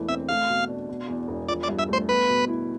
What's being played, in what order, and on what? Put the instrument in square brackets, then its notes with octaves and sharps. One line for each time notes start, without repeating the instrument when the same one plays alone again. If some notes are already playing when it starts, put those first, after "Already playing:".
Already playing: [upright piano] E1 E3 A3
[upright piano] C4 [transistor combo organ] E5
[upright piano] A3 [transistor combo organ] F5
[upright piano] B2
D4
B2
E2
E1
[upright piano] F3 [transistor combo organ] D5
[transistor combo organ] D5
[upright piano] G2
[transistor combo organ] E5
[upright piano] A3 [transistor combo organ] C5
[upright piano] B3 [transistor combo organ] B4
[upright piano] B2
E4